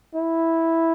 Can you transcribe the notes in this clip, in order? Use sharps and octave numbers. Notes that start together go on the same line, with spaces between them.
E4